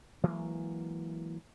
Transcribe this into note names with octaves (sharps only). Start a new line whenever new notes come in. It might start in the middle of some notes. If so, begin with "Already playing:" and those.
E3 F#3 G#3 A#3